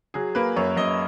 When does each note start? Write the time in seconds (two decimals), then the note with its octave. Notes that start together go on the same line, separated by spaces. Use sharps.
0.14 F#3 G#4
0.35 A#3 B4
0.56 F#2 C#5
0.77 F#2 D#5